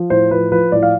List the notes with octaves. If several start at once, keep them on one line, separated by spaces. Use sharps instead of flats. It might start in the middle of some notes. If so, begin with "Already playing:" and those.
Already playing: F3
A2 C5
F3 B4
F3 B4
A2 D5
F5